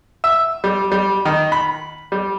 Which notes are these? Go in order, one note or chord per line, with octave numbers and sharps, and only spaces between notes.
E5
G3
G3
D#3
B5
G3